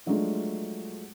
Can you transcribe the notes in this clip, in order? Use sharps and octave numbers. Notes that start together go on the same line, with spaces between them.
F3 F#3 G#3 A3 D4 F4